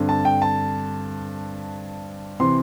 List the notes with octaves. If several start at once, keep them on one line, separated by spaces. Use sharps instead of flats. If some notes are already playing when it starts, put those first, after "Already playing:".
Already playing: G2 D3 C4
A5
G5
A5
C3 E3 C4 C6